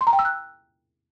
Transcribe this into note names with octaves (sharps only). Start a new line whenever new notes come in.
C6
A#5
G5
E6
F#6